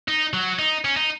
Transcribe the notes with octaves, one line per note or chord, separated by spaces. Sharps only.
D#4
F#3
D#4
C#4
D#4